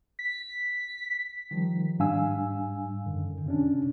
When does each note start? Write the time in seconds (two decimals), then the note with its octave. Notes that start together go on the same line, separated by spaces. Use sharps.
0.19 B6
1.51 D#3 F3 G3
1.99 G#2 G3 D4 F5 G#5 E6
3.06 F#2 D3 D#3
3.46 C3 C#4 D4